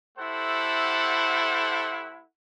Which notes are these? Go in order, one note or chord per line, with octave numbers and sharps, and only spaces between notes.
A3 E4 G4 A4 C5 F#5